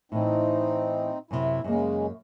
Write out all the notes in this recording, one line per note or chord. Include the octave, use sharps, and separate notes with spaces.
A2 E3 C4 D#4
F#2 C3 E4
F#2 C#3 G#3 A#3